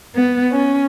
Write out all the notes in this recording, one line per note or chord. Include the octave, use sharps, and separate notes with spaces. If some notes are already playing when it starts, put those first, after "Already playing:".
B3
C#4